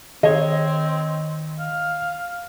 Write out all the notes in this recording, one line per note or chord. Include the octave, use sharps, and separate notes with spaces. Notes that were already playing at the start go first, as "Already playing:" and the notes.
D#3 C4 C#5 D#5
F5